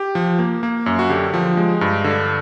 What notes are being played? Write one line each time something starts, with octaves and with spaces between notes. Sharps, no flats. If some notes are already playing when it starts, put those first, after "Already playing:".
Already playing: G4
F3
A#3
A#3
F#2
F#4
D3 G4
F3
G#3
G2
D3